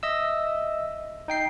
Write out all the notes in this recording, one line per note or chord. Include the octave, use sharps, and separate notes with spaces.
D#5 E5 E6
D#4 G5 C7